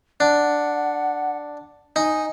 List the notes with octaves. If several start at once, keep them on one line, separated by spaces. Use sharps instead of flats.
D4 F#5
D#4 G#5